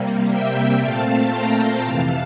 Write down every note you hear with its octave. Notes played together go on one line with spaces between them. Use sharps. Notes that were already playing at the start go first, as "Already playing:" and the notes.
Already playing: C3 G3 A#3
E5 G5
A#2 A3 C4 F5 A5
G5 A#5
F2 C3 E3 F5 A5